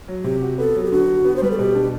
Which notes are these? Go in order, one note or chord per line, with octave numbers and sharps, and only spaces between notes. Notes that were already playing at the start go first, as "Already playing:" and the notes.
F#3
C3 G4
F#4
B3 A4
F#3
G4
D3 F#4
D3
B3
C5
G3 B4
A4
B2 G4
D4